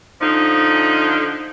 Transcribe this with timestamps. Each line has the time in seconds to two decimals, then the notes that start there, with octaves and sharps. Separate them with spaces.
0.21 D3 F3 D#4